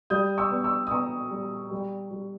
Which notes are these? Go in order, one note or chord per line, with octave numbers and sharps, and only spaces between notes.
G3 D#6 G6
C#6 E6
B3
C#6 E6
D#6
B3 A#5 C#6
G3
G3
G3